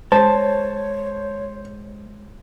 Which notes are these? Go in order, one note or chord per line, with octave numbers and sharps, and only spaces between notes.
G#3 C5 C#5 A5